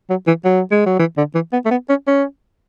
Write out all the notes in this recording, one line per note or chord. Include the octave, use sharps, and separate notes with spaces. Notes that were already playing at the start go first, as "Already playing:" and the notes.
F#3
E3
F#3
G#3
F#3
E3
D3
E3
B3
A3
B3
C#4
C#4